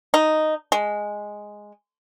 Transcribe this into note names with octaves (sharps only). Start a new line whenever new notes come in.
D#4
G#3